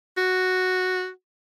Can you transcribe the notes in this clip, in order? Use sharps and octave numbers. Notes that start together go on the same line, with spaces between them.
F#4